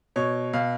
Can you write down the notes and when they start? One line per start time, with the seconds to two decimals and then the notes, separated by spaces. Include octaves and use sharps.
0.16 B2 C#5
0.53 B2 F5